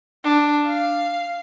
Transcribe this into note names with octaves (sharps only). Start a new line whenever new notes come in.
D4
F5